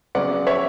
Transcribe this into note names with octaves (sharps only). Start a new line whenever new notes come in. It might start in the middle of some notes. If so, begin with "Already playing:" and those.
C#3 F#3 B3 D5 F#5
C#5 E5